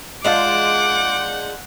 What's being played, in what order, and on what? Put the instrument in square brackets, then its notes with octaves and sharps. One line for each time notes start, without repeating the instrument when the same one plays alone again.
[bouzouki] G#3 D4 F4 [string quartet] F#5 G6 [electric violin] D6